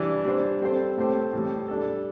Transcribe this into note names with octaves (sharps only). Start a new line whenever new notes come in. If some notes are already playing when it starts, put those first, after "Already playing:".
Already playing: E3 G3 D4
G3 D4 C5
G3 C4 A4 C5
A2 A3 C4 G4 C5
A2 E3 G3
G3 D4 A4